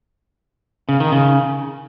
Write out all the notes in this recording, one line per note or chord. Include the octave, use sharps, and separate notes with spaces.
C#3
D#3
C#3